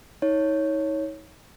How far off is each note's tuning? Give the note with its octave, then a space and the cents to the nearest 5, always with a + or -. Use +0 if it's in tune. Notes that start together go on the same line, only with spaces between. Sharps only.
D#4 +35 C#5 +0